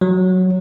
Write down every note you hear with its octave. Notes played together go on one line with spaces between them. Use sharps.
F#3